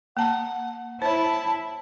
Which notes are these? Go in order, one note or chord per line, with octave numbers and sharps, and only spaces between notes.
A#3 F#5 A5 A#5
E4 C5 C#5 A5